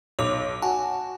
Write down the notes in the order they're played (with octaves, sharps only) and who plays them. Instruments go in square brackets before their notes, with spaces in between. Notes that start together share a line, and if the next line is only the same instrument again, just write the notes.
[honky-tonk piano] B1 [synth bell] C#5 D6
[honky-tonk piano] F#4 [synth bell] G#5 A5